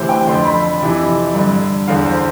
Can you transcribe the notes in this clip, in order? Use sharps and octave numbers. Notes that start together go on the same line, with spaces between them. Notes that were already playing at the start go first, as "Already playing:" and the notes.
Already playing: D2 C3 E3 B4 C5
G5
F2 D3 C6
B5
F2 C3 E3
G2 D3
E2 D3 F5
C5